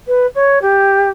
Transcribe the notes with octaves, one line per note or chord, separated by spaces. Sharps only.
B4
C#5
G4